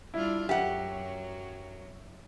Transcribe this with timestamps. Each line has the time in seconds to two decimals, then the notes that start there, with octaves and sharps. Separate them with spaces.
0.14 G3 D4 E4 F4
0.49 F#2 F#3 G4 E5 F#5